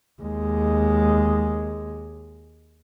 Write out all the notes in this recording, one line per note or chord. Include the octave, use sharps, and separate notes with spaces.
D#2 G#3